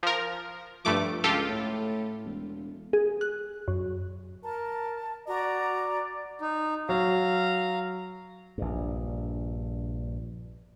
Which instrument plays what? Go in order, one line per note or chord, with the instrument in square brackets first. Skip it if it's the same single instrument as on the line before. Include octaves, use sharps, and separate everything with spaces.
[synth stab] F3 A#4
[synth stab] G2 A3 D6 [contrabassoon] F3
[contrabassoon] C#2 [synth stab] F4 G4 A4
[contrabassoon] A2
E1
[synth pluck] G#4
F#6
F#2
[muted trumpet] A#4 [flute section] A5
[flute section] F#4 A#5 [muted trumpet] D5
[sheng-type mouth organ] D#4
[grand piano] F#3 [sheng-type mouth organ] F5 A#5
[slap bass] A#1 G2